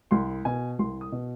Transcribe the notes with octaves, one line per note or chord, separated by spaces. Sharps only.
C2 C6
B2 G#5
C2 C6
D#6
B2